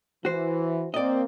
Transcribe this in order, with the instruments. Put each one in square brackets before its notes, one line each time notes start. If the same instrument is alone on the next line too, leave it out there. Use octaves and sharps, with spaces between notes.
[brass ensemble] E3 [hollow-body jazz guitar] F#4 C5
[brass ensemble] A#3 C4 [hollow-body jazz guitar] D5 D#5